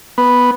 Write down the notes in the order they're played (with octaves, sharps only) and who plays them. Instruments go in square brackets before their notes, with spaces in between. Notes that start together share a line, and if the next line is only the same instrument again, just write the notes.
[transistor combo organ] B3